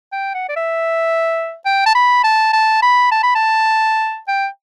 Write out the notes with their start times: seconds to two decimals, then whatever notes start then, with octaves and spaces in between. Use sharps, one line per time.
0.12 G5
0.34 F#5
0.49 D5
0.56 E5
1.65 G5
1.86 A5
1.95 B5
2.24 A5
2.53 A5
2.82 B5
3.12 A5
3.23 B5
3.35 A5
4.28 G5